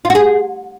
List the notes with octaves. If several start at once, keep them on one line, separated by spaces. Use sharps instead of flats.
F4
F#4
G#4